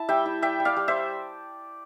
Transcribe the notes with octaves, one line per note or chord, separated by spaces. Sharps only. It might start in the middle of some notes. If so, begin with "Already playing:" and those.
Already playing: E4 A5
G3 E5 G5
E4
G3 E5 G5
G3
D5 F5
G3
C5 E5